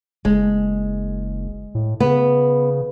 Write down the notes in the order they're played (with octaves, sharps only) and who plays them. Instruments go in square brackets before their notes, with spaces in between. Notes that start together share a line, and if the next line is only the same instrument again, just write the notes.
[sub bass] F#1 [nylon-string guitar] G#3
[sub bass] A2
[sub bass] C#3 [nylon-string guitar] B3